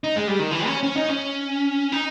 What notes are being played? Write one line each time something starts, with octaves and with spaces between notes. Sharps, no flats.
D#4
G#3
G3
D#3
E3
C#4
C#4
D#4
C#4
D#4